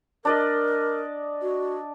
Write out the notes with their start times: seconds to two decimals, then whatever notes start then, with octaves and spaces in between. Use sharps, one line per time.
0.25 D4 A#4 D5 D#5
1.42 F#4